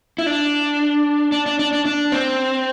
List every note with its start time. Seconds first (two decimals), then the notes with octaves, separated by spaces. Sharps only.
0.18 E4
0.26 D4
1.32 D4
1.46 D4
1.59 D4
1.73 D4
1.85 D4
2.12 C4